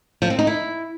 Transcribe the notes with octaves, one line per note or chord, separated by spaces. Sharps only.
F3
C4
D#4
E4